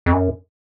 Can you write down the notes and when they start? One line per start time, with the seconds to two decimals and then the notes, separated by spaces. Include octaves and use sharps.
0.06 F2
0.13 F#2